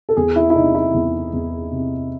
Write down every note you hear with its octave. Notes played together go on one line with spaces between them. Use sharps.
A4
E2 G#4
E4
E4
C3 D#4
E4
E2
E2
C3